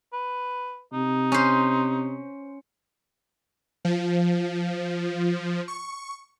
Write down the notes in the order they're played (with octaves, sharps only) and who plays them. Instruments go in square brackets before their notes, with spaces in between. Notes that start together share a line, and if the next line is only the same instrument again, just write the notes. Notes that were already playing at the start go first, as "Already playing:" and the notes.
[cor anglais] B4
[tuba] C3 [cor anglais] D#4
[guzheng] C#4 C5
[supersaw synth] F3
C#6